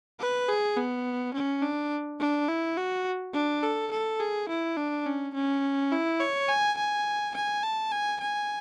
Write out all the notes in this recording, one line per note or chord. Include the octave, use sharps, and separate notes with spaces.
B4
G#4
B3
C#4
D4
D4
E4
F#4
D4
A4
A4
G#4
E4
D4
C#4
C#4
E4
C#5
G#5
G#5
G#5
A5
G#5
G#5